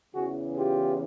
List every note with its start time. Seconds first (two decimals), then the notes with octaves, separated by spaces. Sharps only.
0.13 E2 C#3 E3 F#4 G#4
0.55 F4 G4